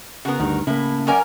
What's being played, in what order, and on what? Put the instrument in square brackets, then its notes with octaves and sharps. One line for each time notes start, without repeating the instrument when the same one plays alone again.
[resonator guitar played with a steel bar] C#3 B3 [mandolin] F#4 A#4
[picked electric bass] D2 G2 [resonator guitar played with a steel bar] D#3
[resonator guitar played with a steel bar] A2 [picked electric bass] C#3 A#3 [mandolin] E4
[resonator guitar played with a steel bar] F#2 D5 F#5 [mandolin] C#4 A#4 G#5